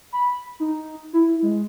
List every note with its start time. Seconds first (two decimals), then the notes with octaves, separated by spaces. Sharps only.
0.13 B5
0.60 D#4
1.13 E4
1.43 G#3